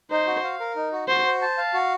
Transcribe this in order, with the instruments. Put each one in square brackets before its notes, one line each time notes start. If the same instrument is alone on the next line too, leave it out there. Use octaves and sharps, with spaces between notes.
[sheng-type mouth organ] D#4 [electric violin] C5
[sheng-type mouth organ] F#4
F5
A#4
D#4
F#4
[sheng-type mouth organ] F#4 [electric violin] C5
[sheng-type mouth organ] C5
A5
F5
F#4